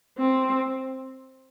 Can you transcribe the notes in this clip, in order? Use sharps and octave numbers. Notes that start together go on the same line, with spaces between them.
C4